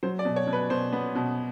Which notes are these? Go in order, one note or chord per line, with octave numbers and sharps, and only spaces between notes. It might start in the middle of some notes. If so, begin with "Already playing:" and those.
F#3 C5
D5
B2
C#5
B2
B4
B2 C5
B3
B2